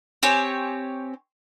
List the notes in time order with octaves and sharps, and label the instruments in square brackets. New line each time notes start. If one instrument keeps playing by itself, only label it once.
[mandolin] C4 G4 C#5 G#5